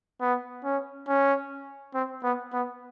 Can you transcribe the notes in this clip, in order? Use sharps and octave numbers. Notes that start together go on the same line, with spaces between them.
B3
C#4
C#4
C4
B3
B3